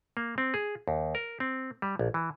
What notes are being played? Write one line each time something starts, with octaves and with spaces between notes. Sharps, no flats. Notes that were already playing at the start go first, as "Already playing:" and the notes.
A#3
C4
G#4
D#2
A#4
C4
G3
A#1
E3